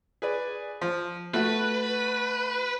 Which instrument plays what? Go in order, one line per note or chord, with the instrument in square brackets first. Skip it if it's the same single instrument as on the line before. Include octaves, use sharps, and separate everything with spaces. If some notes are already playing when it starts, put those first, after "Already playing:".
[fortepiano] G#4 B4 D5
F3
[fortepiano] A3 F#4 [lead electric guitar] B4